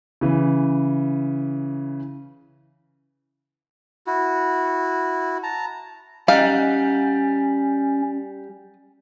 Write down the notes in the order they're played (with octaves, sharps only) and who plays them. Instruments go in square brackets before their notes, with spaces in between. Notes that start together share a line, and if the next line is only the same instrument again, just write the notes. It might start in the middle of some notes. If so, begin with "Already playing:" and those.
[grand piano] C#3 E3
[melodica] E4 F#4
A5 A#5
[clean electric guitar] G3 [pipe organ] C#4 [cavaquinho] D#4 F#5 [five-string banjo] F5